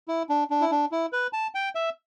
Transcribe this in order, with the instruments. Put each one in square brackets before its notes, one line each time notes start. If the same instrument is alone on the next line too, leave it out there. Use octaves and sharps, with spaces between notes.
[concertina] E4
D4
D4
E4
D4
E4
B4
A5
G5
E5